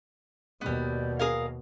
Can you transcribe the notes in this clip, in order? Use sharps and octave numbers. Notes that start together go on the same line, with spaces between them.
D#2 B2 G3 B3
G#4 A#4 F5